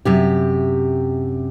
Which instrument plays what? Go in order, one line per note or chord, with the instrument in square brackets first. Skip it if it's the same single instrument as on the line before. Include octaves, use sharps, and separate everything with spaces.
[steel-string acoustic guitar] F#2 C3 G4